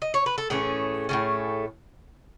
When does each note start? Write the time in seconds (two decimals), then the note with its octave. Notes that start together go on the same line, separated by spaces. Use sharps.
0.02 D#5
0.14 C#5
0.26 B4
0.38 A4
0.50 A2 E3 A3 C#4 G#4
1.09 A2 E3 A3 C#4